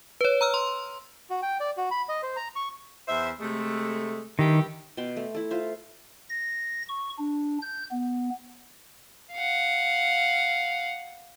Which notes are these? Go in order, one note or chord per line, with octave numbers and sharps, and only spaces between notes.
B4 C#5
A#5 E6 F6
C6
F#4
G5
D5
F#4
B5
D#5
C5
A#5
C#6
E2 C5 E5
C3 G#3 A3
G2 D#3 E4 G4
B2 G5 A5 C6
A3
E4 A4
F4 C5 E5
A#6
C#6
D4
G6
B3
F5 F#5